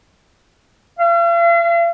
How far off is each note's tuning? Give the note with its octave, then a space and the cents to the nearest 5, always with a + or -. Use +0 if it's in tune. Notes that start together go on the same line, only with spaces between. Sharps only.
F5 -45